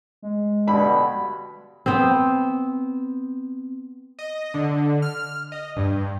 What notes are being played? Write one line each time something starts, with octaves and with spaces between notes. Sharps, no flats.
G#3
G2 B2 D3 B5
B3 C4
D#5
D3
F6
D#5
G2